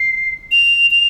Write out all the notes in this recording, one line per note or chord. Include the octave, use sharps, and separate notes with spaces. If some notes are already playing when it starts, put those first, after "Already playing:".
Already playing: C7
F7
F7